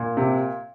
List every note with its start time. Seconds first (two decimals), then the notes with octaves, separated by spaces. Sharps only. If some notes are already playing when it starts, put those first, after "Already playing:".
Already playing: A#2
0.17 C3